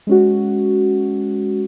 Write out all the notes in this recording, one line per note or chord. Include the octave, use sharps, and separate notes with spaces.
G#3 C#4 F#4